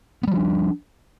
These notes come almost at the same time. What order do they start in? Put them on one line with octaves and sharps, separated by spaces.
B3 G3 F3 D4